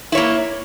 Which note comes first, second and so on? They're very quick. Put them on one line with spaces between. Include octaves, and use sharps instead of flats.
E4 C#5 A#3